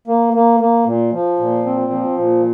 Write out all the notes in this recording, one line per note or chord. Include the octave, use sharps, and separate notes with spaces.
A#3
A#3
A#3
A#2
F3
A#2
C4
F3
A#2